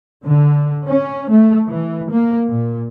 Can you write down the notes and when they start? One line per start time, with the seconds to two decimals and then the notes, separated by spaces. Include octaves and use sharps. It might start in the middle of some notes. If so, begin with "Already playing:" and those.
0.24 D3
0.84 C#4
1.30 A3
1.67 E3
2.10 A#3
2.47 A#2